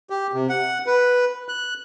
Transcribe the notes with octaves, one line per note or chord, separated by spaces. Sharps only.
G4
C3
F#5
B4
F#6